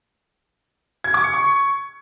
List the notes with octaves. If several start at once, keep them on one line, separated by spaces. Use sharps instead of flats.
G#6
D6
C#7
C#6